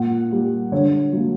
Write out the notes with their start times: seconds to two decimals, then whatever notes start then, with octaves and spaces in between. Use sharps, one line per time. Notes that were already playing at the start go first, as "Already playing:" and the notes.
Already playing: A#2 F#5
0.31 G3 A#3
0.72 D3 C#5
1.13 F#3 A#3